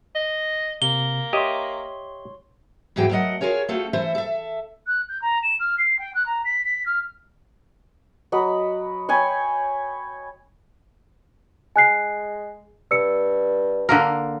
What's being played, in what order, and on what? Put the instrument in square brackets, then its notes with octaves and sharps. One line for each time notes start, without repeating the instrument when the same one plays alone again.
[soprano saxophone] D#5
[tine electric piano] C3 [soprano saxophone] A#3 [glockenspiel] G7
[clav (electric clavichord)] G4 D#5 E5 [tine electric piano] C#5 C6
[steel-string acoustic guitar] E2 G#2 E3 F#4 G#4 G5
F#3 A3 A#4 D5 D#5 F#5
F4 F#4 G#4 A#4 C#5
A3 C4 F4 F#4 A4
E3 A3 C5 E5
A4 E5
[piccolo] F#6
G6
A#5
E7
F6
C7
G5
F#6
A#5
B6
B6
F6
[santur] F#3 D#5 B5
C#5 G5 G#5 B5
[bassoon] G#3 [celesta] G#5 F#6 C7
[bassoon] G2 [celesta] E6 C#7
[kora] D3 A#3 A#4